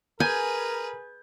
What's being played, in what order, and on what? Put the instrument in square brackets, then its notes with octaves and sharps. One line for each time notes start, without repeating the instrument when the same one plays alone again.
[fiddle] G#4 B4 [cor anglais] A#4 [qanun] G#5 [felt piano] G6 G#6